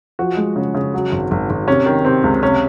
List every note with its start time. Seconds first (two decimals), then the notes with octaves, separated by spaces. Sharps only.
0.19 F3 F#4
0.37 G#3
0.56 C#3
0.75 C#3
0.94 F#3
1.12 G#1
1.31 G#1
1.50 G#1
1.67 C3 C#4
1.86 D#3
2.05 C3 C4
2.24 C#2
2.43 C3 C#4